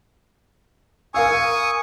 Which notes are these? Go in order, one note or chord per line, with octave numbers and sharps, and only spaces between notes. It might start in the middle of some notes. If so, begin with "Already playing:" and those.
A#4 F5 G#5 C#6 D#6 E6